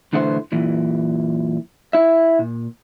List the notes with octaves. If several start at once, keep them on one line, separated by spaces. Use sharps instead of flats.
B1 D3 E3 A3 G4 C5
F#2 A#2 E3
E4 E5
A#2